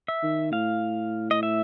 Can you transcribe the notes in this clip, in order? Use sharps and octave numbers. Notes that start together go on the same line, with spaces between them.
E5
D#3
A2 F5
D#5
E5